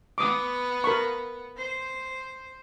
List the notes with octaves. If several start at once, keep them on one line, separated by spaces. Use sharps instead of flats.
B3 D6 D#6
A#4 B5 C#6
C5